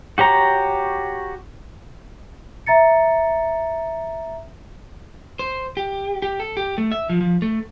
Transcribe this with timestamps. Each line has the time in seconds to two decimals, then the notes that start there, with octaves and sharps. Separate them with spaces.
0.18 F#4 G4 C#5 A#5
2.66 E5 A#5 A6 C#7
5.39 C5
5.77 G4
6.22 G4
6.40 A4
6.57 G4
6.78 A3
6.92 E5
7.09 F3
7.21 F3
7.42 A3